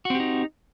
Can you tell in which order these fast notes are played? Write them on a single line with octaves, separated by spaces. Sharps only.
F#4 C4 G4 D#4